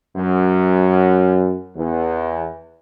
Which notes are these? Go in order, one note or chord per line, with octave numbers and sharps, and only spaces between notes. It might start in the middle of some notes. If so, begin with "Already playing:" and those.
F#2
E2